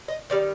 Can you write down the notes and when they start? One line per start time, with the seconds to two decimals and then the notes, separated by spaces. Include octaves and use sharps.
0.08 D#5
0.30 D#3 G3 D5